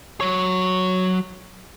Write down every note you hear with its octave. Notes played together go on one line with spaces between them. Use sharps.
F#3 C#5